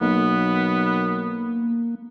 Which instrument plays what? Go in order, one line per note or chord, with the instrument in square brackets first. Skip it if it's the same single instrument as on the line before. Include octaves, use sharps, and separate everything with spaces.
[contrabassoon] B1 [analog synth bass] A#3 [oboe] B3